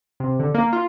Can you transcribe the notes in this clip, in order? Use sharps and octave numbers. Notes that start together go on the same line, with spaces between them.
C3
D3
A#3
F4